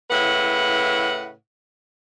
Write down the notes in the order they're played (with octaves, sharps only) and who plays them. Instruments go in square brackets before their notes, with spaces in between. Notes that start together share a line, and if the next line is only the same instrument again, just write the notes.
[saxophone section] A2 C#3 E4 B4 F#5